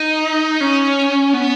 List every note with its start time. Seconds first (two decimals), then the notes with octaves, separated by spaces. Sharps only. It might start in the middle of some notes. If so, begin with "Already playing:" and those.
Already playing: D#4
0.61 C#4
1.33 B3